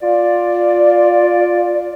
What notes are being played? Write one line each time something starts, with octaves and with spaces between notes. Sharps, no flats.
F4 D5